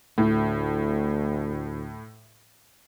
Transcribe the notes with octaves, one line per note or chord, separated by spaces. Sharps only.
D2 A2